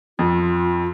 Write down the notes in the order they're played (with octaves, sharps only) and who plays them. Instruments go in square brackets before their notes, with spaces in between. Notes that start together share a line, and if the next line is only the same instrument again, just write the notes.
[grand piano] F2 [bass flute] F4